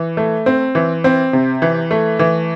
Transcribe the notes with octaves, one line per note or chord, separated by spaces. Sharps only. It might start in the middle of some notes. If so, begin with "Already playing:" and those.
Already playing: E3
A3
C4
E3
C4
C3
E3
A3
E3